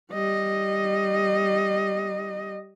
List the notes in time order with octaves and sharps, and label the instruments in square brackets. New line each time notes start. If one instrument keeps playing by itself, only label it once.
[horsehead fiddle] G3 D#5